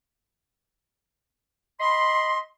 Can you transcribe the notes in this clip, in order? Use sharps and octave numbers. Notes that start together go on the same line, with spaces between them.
D#5 B5 C6